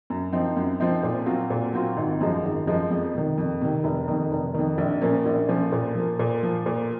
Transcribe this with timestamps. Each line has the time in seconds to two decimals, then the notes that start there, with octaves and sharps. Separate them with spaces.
0.10 F#2
0.33 F3 C4 D#4
0.56 F#2
0.80 F3 C4 D#4
1.03 A#2
1.26 F#3 C4 F4
1.50 A#2
1.73 F#3 C4 F4
1.97 G#1
2.20 F#2 F3 G#3
2.43 G#1
2.67 F#2 F3 G#3
2.90 F2
3.15 C3 D#3
3.38 F2
3.61 C3 D#3
3.84 F1
4.08 F2 D#3
4.32 F1
4.54 F2 D#3
4.78 A#1
5.02 A#2 F3 A#3 C#4
5.26 A#1
5.49 A#2 F3 A#3 C#4
5.72 A#2
5.95 F3 A#3
6.19 A#2
6.43 F3 A#3
6.66 A#2